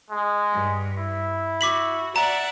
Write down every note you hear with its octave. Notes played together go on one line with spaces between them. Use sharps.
G#3
G2
E4
F#4 D6 B6 F#7
D5 E5 F#5 A#5